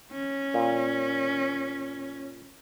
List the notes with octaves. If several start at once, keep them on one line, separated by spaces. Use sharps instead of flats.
C#4
A#2